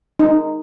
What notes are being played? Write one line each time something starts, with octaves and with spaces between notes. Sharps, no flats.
D#4